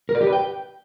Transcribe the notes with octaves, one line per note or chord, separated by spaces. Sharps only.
A#4
D5
G4
B4
G5